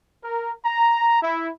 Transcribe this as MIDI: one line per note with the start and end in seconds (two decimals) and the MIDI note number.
0.24 0.53 70
0.65 1.19 82
1.22 1.50 64